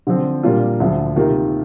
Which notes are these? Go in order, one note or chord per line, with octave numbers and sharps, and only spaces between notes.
D3 F3 C4
A#2 G3 A#3 D4 F4
D2 D3 F3
C3 D#3 A#3 F4 A#4